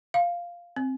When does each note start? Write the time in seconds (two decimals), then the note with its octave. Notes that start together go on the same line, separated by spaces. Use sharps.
0.14 F5
0.76 C4